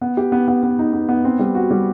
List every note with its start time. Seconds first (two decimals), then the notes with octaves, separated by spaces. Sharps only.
0.01 B3
0.17 G4
0.32 B3
0.48 B3
0.63 B3
0.79 D#4
0.93 B3
1.09 B3
1.25 C4
1.39 G3
1.55 F#4
1.71 G3